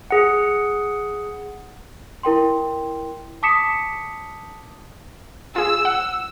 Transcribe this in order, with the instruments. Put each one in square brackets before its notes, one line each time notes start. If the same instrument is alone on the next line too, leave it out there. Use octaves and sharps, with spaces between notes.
[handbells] G#4 F#5
[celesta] E4 A#4 G5 C6
A5 D6 D#6 B6 C#7 E7
[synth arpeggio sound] F4 G#4 [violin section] E6
[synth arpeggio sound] F#5